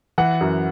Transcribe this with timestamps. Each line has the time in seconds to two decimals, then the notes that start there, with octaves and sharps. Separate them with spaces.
0.18 E3 F#5
0.41 F#2